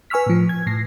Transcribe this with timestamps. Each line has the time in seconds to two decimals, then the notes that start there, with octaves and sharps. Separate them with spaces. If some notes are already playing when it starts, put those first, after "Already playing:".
0.10 B4 G#5 C#6 E6 F6 B6
0.26 A2 F3
0.49 G#6
0.67 A2 A#6 C7